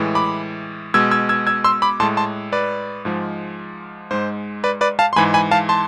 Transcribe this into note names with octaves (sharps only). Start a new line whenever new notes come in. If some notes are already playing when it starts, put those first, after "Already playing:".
Already playing: A2 E3 G#3
B5 D6
B2 G#3 E6 G#6
E6 G#6
E6 G#6
E6 G#6
C6 E6
B5 D6
A2 G#3 A5 C6
A5 C6
B4 D5
G#2 F3 G#3
G#2 G#3 C5
B4 D5
B4 D5
F5 A5
C6
G#2 E3 G#3 G#5 B5
G#5 B5
F5 A5
A5 C6